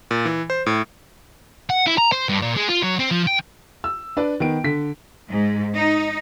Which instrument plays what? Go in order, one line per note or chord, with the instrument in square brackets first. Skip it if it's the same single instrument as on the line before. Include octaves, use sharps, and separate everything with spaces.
[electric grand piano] A#2
E3
C5
A2
[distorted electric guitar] F#5
E4
A#5
C5
G2
A#2
G#3
F4
F#3
C4
F3
G5
[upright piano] E6
D4 B4 D5
D#3 B3 D7
D3 B6
[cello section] G#2
D#4